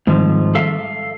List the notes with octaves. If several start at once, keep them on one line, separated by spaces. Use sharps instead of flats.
G#2 D#3 F3 G3 C4
A4 E5 F5